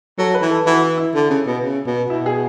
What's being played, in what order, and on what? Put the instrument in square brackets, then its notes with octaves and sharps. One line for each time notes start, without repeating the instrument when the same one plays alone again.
[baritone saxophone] F#3 [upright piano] A4
[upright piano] B4
[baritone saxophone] E3
[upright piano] A4
[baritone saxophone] E3 [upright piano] F#4
[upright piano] E4
E4
[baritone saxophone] D3
C#3
B2
C#3
B2
[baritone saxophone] B2 [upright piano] E4
[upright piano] G#4